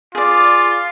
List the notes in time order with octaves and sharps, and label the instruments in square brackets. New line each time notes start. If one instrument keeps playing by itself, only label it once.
[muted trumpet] F4 [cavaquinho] G#4 D5